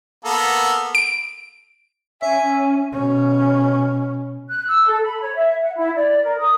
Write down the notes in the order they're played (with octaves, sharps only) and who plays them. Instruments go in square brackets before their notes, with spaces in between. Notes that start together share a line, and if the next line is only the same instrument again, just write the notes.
[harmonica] A#3 B3 A4
[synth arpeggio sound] D7
[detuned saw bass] C#4 [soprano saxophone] E5 [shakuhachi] G#5
[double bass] B2 C#4
[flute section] F#6
E6
A4
B5
C#5
E5
F#5
E4
D5
A#4
D#6